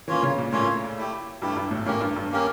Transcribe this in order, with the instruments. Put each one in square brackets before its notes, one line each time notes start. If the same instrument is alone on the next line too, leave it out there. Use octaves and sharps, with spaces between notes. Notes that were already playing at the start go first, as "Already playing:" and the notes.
[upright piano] E3 [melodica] A#3 C#4 F4 C#5
[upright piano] C#3
A#2
[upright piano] A2 [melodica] A#3 C#4 F4 C#5
[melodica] A3 E4 G4
[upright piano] G2 [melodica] A3 E4 G4
[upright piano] G2
A2
[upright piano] A2 [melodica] A#3 C#4 G4 A#4
[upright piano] G2
G2
[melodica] A#3 C#4 G4 A#4